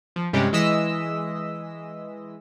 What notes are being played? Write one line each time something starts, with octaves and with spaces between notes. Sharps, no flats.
F3
G2 C3 G3 G#3 C#4 G4
E3 G#3 D#5 E6 B6